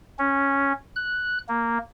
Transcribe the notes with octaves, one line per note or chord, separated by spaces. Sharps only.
C#4
F#6
A#3